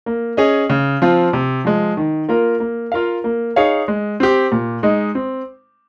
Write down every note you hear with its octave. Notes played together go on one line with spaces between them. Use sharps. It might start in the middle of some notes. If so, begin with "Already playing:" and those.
A#3
C#4 G#4 D#5
C#3
F3 C4 F4
C3
F3 G#3
D#3
A#3 F4 A#4
A#3
F4 A#4 F5
A#3
D#4 G#4 C#5 F5
G#3
C4 G4
A#2
G#3 D#4
C4